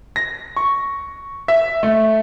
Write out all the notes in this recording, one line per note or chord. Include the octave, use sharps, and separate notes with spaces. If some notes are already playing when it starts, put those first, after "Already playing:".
A#6
C#6
E5
A3